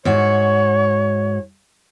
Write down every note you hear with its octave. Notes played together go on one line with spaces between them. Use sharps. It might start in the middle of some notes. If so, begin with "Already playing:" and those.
G#2 F#4 C#5